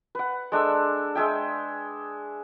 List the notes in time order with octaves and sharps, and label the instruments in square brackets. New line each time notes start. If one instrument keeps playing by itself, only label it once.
[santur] B4 F#5
G#3 D4 A4 E6
G#3 G#4 E5 G5